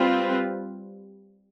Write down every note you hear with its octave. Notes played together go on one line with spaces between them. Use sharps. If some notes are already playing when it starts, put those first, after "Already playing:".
Already playing: G3 C4 F4 B4